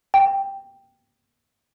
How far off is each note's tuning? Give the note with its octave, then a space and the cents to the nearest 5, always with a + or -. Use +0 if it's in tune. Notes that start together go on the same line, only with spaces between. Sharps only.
G5 +5